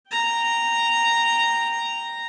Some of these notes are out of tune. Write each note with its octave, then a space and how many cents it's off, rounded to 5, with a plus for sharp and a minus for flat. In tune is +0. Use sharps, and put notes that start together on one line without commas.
G5 +0 A#5 -5